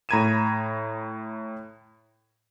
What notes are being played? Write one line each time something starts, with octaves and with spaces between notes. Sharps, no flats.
A2 A#5 B5 G#6 D#7 E7